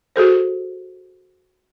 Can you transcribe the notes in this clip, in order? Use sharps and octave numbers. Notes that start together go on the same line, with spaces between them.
F#4 G#4 A4 C5